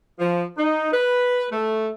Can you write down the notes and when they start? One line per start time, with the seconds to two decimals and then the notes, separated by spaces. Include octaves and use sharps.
0.19 F3
0.58 D#4
0.92 B4
1.51 A3